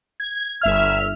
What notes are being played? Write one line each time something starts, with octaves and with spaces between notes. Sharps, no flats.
G#6
G1 E5 F6